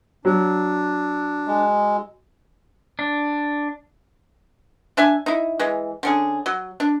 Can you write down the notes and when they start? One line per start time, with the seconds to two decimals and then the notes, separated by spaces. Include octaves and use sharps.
0.25 F#3 D4
1.47 G#3
2.99 D4
4.97 D4 E5 G#5
5.26 D#4 E4
5.59 E3 G#3
6.03 D3 C#4 G#4
6.46 F#3
6.80 D4